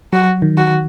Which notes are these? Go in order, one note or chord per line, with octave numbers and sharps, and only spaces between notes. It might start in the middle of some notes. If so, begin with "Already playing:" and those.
F#3 F#4
D#3
F#4